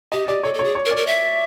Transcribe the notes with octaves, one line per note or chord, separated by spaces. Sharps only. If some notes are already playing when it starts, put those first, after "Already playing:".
G4 D#5
G4 D5
A4 C#5
A4
C#5
G#4
C#5
A#4
D5
A#4
E5